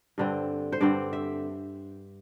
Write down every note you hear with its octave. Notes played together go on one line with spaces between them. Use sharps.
G2 D3 C4
C5
G2 D3 C4 D5
E5